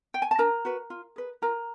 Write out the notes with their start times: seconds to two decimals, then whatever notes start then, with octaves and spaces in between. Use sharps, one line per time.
0.14 G5
0.22 G#5
0.31 A5
0.38 D4 A#4 A#5
0.65 F#4 B4
0.90 F4
1.16 G#4 B4
1.42 F4 A#4 A#5